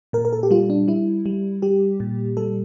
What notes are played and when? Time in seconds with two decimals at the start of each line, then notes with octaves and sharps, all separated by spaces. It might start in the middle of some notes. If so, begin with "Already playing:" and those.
0.13 A#2 A#4
0.25 A#4
0.33 A4
0.43 G4
0.51 G3 F4
0.70 D4
0.88 G3 E4
1.26 G3
1.62 G3 G4
2.00 A#2
2.37 G3 A4